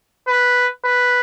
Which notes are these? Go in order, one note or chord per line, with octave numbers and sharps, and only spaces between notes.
B4
B4